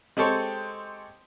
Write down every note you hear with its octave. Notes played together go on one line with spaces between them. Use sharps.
G#3 C4 G4 A4 C#5